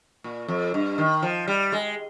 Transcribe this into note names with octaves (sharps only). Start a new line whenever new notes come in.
A#2
F2
G2
D#3
F3
G3
G#3